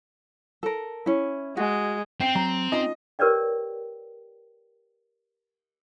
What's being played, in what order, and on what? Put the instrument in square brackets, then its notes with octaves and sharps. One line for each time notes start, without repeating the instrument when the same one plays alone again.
[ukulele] A4 A#4
C#4 E4
[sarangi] G#3 [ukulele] F#4
[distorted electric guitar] C4 [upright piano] G5 C7
[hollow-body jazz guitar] F#3 [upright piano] A#5
[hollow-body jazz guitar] C#4 D#4 F4 [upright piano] D#5
[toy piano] G4 A#4 B4 C#5 D5 G5